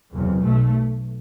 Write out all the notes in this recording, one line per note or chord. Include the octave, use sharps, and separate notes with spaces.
F#1 E2 C3
B1 B2 A3